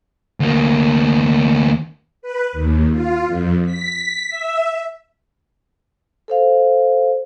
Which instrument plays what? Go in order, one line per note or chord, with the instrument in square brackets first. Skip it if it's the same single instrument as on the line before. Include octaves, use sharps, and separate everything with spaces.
[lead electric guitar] D2 A#3
[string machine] B4
D#2
F4
F2
B6
E5
[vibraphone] A4 C5 F5